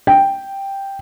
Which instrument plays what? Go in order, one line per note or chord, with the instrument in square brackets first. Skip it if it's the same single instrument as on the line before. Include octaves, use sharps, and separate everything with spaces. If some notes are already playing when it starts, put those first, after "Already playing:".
[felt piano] G5